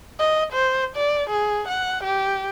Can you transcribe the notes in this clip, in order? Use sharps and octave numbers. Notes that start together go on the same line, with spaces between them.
D#5
C5
D5
G#4
F#5
G4